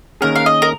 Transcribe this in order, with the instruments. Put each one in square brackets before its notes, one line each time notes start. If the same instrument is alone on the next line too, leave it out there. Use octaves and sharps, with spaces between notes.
[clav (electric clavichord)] D#3 A#3 C#4 G#4 [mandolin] A#4
[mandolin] F5
D#5
A#4